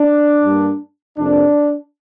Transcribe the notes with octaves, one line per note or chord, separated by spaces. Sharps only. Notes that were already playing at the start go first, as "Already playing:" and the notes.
Already playing: D4
G2 G3 A#3
F2 C3 A#3 D4